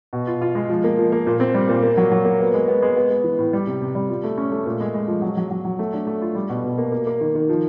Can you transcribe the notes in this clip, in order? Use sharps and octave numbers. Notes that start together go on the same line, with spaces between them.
B2
F4
F4
G#3
F3
A#3
F3
A#3
A#2
C4
G3
A#2
A#3
F#3
F#3
A#3
B3
G#3
B3
G#3
B3
B3
E3
A2
G3
C3
C3
G3
F4
A3
C#4
A3
A#2
G#3
G#3
F3
F#3
F#3
F#3
F#3
A3
D4
A3
F4
G3
B2
B2
A#3
A#3
A#3
D#3
D#3
F3